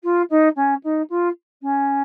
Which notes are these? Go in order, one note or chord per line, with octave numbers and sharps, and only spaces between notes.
F4
D#4
C#4
D#4
F4
C#4